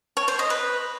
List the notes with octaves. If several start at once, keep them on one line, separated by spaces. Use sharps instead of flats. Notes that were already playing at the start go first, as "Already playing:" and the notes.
C#5
C5
D#5
B4